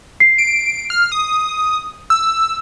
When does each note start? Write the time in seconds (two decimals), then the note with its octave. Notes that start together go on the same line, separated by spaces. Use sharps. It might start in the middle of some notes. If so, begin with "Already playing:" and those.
0.20 C7
0.38 D7
0.90 F6
1.12 D#6
2.10 E6